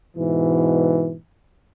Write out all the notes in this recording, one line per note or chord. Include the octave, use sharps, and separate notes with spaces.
G#2 B2 E3